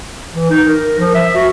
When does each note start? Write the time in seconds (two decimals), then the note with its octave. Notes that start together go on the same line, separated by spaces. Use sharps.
0.34 E3
0.50 D#4
0.66 A#4
0.99 F3
1.14 E5
1.35 F#4